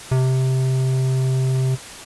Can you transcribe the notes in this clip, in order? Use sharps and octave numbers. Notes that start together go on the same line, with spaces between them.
C3